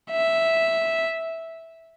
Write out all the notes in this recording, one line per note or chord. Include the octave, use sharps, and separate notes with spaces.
E5